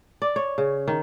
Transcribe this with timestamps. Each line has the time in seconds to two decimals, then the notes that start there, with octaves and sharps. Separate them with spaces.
0.22 D5
0.36 C#5
0.58 C#3
0.88 D#3